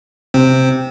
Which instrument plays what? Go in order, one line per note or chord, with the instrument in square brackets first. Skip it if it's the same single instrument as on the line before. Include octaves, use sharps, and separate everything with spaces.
[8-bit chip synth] C3 C4